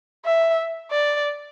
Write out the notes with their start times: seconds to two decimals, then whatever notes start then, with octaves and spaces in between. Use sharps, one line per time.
0.25 E5
0.91 D5